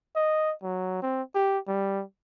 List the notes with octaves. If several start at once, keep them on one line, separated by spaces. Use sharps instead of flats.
D#5
F#3
C4
G4
G3